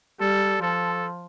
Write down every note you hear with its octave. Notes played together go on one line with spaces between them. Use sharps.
G3 A4
F3 A4